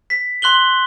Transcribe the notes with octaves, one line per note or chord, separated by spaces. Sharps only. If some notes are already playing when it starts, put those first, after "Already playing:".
B6
C6 F#6 F#7 G7